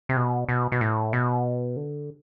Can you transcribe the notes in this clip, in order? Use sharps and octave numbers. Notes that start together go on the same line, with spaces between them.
C3
B2
B2
B2
A2
B2
D3